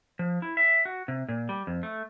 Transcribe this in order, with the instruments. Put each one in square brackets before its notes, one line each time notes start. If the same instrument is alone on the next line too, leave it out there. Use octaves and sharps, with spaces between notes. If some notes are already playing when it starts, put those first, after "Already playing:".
[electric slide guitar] F3
E4
E5
F#4
C3
A#2
G3
F2
A3